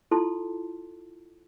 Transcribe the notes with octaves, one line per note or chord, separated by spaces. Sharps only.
E4 F4 A4 A5 C6